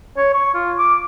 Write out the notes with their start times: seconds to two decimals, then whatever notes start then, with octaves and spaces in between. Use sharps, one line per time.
0.17 C#5
0.34 C#6
0.54 F4
0.78 D6